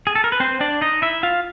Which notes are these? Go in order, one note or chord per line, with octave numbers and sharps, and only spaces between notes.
G#4
A4
A#4
B4
C4 C5
D4 D5
D#4 D#5
E4 E5
F4 F5